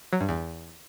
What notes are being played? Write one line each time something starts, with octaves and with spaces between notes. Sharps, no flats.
F#3
G2
E2